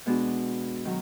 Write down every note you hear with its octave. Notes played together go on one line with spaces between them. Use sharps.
B2 G#3 B3 D4 F#4
D#3 F#3